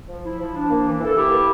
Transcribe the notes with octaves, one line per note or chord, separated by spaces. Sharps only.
F3
E4
F3
D4
A#3
E3
E3 A4
E4 G4
A#3